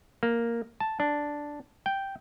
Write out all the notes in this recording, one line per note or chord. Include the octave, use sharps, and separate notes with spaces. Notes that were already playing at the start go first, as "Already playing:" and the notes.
A#3
A5
D4
G5